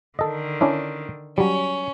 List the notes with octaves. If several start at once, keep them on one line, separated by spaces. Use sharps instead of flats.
D3 D#3 A4 D#5
C#4 D4 E4
F#3 G3 C#4